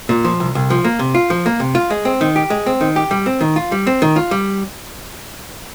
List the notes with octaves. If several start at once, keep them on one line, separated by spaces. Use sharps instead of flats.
A#2
F3
C2
C2
F3
A#3
C3
F4
F3
A#3
C3
F4
G#3
C4
D#3
G4
G#3
C4
D#3
G4
G3
C4
D#3
F4
G3
C4
D#3
F4
G3